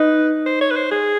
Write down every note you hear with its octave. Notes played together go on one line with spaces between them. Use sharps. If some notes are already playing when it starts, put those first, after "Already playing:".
Already playing: D#4 B4
C5
C#5
B4
C5
G#4